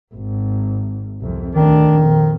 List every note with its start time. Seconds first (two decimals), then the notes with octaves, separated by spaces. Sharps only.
0.14 G#1
1.21 C2 F2
1.55 D2 D#3 D4
1.98 F2 A#2